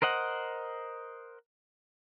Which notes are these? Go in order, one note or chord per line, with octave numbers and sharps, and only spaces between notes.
A#4 C5 D#5 F#5